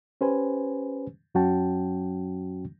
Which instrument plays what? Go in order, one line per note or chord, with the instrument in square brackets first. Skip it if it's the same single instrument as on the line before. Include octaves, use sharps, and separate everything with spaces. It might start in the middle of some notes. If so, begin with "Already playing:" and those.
[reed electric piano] C#4 G4 B4 C5 G#5
F#2 F#3 C#4 F#4 G5 A5